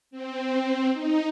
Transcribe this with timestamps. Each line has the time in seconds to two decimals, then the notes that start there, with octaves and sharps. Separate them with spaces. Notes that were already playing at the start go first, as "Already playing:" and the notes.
0.11 C4
0.93 D#4